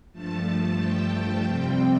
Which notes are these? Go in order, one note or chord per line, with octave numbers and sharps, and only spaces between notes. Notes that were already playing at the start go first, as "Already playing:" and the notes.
G2 F3 A3 A5
G5
F2 C3 G3 C4 G5